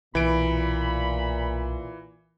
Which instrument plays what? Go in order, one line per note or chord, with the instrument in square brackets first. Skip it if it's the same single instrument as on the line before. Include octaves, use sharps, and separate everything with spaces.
[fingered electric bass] B1 [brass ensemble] A#2 [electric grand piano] E3 D7 [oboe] B5